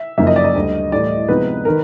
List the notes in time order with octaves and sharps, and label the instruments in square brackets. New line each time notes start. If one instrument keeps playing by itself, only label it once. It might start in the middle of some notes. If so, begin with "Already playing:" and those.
Already playing: [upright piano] E5
[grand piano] F#2 C#3 F3 A#3 D#4 [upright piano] E5
[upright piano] D#5
D5
D#5
[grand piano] D2 D3 G3
[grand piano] A2 E3 G3 [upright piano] D5
[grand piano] C3 F3 G#3 B3 D#4 [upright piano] B4
[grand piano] D#3 [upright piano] A#4